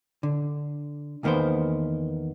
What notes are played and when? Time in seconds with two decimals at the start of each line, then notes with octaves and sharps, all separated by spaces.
0.23 D3
1.23 E2 D#3 A#3 B3 A#4 C5